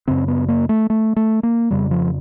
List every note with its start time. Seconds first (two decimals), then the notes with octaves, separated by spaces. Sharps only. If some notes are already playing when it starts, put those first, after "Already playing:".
0.08 F#2 C#3 C4
0.28 B3
0.48 A#3
0.69 A3
0.90 A3
1.16 A3
1.43 A#3
1.71 F2 C#3 G3
1.91 F3